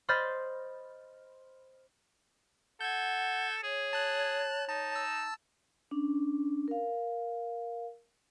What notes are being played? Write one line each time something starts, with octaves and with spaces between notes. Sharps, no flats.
C5 D#5 B5 F6 G6 A6
A4 F#5 G6 G#6
G#4 C#5
A5 F#6
D#4 A5
A5 E6
C#4 D4
A#4 F5